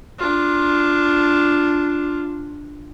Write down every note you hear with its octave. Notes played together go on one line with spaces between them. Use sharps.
D4 F4